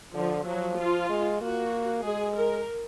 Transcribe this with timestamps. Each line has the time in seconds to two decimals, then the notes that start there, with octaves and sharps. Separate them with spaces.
0.14 D3 F3
0.45 F3 F#3
0.78 F4
1.10 G#3
1.40 A#3 F#4
2.04 G#3 G#4
2.35 A#4